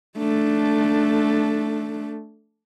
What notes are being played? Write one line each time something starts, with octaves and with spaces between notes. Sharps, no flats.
A3 D4